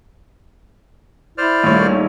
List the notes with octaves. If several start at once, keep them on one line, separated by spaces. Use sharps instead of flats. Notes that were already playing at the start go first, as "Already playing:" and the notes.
E4 C5 D5 F6
A#1 D#3 G3 A3 C#5